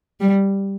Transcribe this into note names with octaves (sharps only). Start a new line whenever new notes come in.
G3